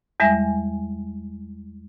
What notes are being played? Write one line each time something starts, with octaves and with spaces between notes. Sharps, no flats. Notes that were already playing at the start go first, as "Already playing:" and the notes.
E2 G3 G#3 E5 G#5 A#6